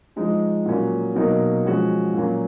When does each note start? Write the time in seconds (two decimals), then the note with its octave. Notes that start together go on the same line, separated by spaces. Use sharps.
0.16 F3 G#3 D#4 G#4
0.66 A#2 F#3 A#3 C#4 F#4
1.15 B2 F#3 A#3 D#4 A#4
1.65 F3 G#3 C#4 F#4
2.14 A#2 F#3 A#3 C#4